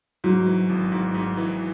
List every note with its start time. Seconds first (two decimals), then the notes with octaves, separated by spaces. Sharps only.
0.24 G#2 F#3
0.47 E3
0.69 G#1
0.92 G#2
1.14 G#2
1.37 E3